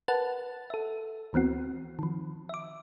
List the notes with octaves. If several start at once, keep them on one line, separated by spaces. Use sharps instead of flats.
A#4 B4 F#5 A5 F#6 A6
A4 E5
D2 E3 B3 C4 F#4
D#3 F3
E5 D6